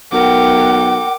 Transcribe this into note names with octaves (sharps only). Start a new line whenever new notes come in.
B1 A#4 F#5 G5 D6